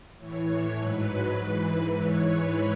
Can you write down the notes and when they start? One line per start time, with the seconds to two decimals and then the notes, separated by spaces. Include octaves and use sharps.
0.17 A2 E3 C#5
0.77 G#2 F#3 B4
1.36 G#2 E3
1.94 G#2 E3 C#5
2.25 B4